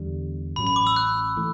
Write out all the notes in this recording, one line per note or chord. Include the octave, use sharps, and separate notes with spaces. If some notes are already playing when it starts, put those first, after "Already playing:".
Already playing: E2 D3 G3
A1 A2 F#3 C#4 B5
B5
D6
E6
F#6
E3 A3